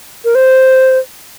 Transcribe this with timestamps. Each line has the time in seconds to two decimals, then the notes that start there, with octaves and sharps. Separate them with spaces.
0.25 A#4
0.35 C5